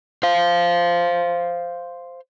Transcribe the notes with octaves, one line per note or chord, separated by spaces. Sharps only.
C5 F5